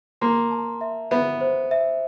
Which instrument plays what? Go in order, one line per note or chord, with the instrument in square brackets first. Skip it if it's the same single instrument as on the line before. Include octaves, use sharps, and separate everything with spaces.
[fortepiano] A#3 [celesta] C6
[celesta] A5
E5
[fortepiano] B3 [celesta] E5
[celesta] C5
E5